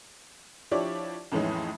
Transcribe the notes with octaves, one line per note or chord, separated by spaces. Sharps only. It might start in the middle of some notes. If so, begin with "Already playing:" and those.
F3 D4 E4 G4 C#5 D5
F2 A2 E3 G#3 C#4 D#4